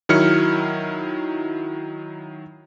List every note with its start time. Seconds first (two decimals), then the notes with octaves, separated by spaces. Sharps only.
0.09 D#3 F#3 E4 F6 C#7